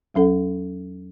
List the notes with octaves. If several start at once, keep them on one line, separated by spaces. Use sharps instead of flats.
E2 F#3 C#4 A4 F#5